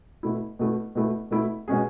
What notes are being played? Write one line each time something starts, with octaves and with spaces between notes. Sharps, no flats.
B2 A3 E4
B2 A3 E4
B2 A3 E4
B2 A3 E4
B2 G#3 C#4 G#4